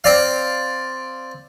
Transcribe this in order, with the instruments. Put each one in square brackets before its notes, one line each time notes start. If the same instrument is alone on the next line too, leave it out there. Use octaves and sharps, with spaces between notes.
[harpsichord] C4 D5 F5